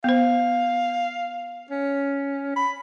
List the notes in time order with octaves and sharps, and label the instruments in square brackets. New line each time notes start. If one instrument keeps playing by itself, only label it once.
[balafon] B3 C5 [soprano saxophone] F5
[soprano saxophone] C#4
B5